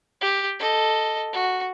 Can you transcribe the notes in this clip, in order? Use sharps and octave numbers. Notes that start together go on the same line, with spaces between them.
G4
A4 D#5
F#4